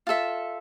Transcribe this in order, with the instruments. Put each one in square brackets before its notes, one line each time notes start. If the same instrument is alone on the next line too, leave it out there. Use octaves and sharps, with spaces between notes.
[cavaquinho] F4 A4 E5